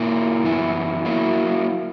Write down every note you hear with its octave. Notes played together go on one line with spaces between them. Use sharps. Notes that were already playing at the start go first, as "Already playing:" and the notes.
Already playing: A#2 A#3 E4 A#4
F#2 E3 B3 E4
F#3 A#3 E4